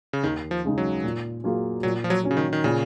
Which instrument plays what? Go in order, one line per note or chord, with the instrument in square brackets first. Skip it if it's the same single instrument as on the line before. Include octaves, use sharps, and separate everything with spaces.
[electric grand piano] C#3
[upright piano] D#2 [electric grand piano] D#3
[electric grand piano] F3
[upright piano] C#3 G#3 D#4
[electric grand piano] F#3
[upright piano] A#2
F#3 A#3 F4 G#4
[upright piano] A#2 [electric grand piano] F#3
[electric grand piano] F3
F#3
[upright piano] F#3 C#4
[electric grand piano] C#3
D#3
D#3
[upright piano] A#2 [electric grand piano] C#3